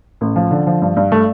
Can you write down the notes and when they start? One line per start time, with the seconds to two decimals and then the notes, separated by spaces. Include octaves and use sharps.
0.21 A1
0.36 F3
0.51 D3
0.67 F3
0.82 G2
0.97 G2
1.12 A3